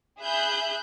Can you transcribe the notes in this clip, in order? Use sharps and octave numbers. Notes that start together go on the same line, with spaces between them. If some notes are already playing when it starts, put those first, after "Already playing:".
G#4 E5 B5 F#6 G6